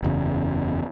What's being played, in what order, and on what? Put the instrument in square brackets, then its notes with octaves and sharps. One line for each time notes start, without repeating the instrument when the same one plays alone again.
[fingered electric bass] F#1 E2 C#3